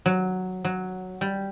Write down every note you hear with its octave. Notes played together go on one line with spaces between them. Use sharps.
F#3
F#3
G3